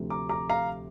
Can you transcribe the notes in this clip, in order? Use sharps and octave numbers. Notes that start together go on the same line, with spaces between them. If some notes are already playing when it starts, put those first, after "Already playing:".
Already playing: D2 C3 F3
A#5 D6
A#5 D6
F5 A#5